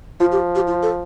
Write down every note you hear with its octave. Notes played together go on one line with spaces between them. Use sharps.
F3 F4
G4
G4
F4
A4